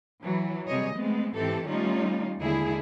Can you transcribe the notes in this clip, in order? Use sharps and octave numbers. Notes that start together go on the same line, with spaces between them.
E3 F#3
C3 G3 G#4 C#5 D#5
G#3 A3 B3 C4
G#2 E3 C4 G4 A4
D#3 G3 A3 C#4 D#4 F4
D#2 D3 G#3 E4 G#4